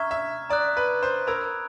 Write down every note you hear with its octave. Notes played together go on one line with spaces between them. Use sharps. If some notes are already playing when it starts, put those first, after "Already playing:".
Already playing: E5 A#5 C#6 F6 G#6
E5
D5 A#5 D#6 F#6
B4
C5
A#4 B5 E6 G#6